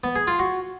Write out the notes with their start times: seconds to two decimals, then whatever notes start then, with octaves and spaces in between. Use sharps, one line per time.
0.04 B3
0.15 G#4
0.27 F4
0.39 F#4